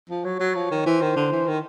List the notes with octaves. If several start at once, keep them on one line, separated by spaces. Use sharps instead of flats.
F3
F#3 C#5
F#3
F3
D#3
E3 C5
D#3
D3
E3
D#3